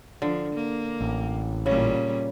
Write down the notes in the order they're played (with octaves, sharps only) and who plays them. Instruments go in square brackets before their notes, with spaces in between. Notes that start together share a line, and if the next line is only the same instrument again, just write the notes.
[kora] D3 [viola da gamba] F3
[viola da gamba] A#3
[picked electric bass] A1
[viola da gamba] A#2 G3 C#4 [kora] C#3